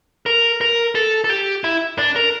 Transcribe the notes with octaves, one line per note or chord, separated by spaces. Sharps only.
A#4
A#4
A4
A4
G4
E4
D4
A#4